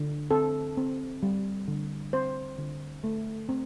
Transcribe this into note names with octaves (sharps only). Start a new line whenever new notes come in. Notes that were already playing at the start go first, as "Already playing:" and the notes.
Already playing: D3
C4 A4
C4
G3
D3
C4 C5
D3
A3
C4